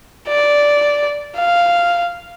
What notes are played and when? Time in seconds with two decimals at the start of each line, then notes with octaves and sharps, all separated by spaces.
0.28 D5
1.37 F5